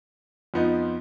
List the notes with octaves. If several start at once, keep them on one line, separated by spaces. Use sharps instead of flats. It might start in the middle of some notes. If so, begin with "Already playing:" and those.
F2 F3 B3 D#4